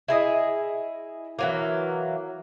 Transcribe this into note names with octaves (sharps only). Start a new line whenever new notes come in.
E4 G#4 D#5
E3 F#3 A#3